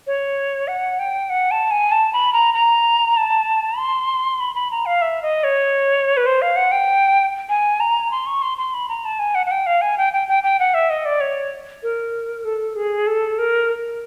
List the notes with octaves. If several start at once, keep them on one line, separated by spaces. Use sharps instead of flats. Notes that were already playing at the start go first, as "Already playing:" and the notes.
C#5
F#5
G5
F#5
A5
G#5
A5
B5
A#5
A#5
A5
C6
B5
B5
A#5
F5
E5
D#5
C#5
B4
C5
F5
F#5
G5
G#5
A#5
C6
C#6
C6
C6
B5
A#5
A5
G#5
F#5
F#5
G5
F5
G#5
G5
G5
G5
G5
F#5
E5
D#5
D5
C#5
A#4
A4
G#4
A4
A#4